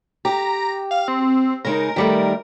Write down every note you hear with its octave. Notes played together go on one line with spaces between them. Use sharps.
G4 A#5
F5
C4
C#3 G#3 D#4 A#4
D#3 G3 A3